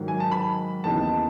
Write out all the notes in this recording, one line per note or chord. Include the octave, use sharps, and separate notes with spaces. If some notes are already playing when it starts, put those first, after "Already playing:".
Already playing: G#2 D#3 F#3
G#5
A5
B5
D#2 C#3 E3 B3 D#4 A5